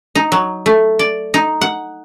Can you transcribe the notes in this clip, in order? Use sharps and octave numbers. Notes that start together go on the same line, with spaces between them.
D#4
F#3
A3
D5
D#4
F#5